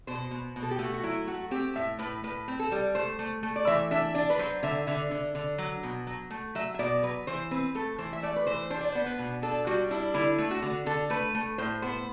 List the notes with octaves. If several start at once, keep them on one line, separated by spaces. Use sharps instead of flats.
B2 C5
B2
B2
A4
G4
A3 F#4
F#4
F#3 E4
A3 F#4
C4 G4
A2 E5
A2 B4
A2 B4
C4
A4
G3
A3 C5
A3
A3
D5
E3 E5
D4 E5
D4 D5
B4
F#3 C5
D3 E5
D3 E5
D3
D3
F#3
B2
F#3
A3
F#3 E5
E5
B2 D5
F#3 B4
E3 C5
C4 B4
A3 A4
E3 C5
E5
A3 D5
B4
E3 C5
D4 C5
D5
B3 C5
B4
B2
D4 A4
G3 F#4
D4 E4
D3 E4
A3
F#4
D3
D3 A4
A3 B4
A3
A2 C5
B3 C5